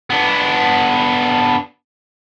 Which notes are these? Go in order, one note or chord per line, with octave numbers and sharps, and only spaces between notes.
B3 D4